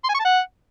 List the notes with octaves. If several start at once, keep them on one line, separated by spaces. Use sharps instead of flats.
C6
G#5
C#6
A5
F#5